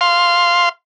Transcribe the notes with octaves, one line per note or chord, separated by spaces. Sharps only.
F5 C6